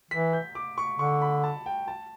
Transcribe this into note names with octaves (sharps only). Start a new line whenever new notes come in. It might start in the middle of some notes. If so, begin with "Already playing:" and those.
E3 B6
G6
D6
C#6
D3 C#6
B5
A5
G5
A5